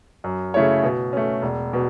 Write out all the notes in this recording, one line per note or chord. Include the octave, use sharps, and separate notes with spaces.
F#2
C#3 A3 E4 C#5
B2
A3 C#4
E1
B2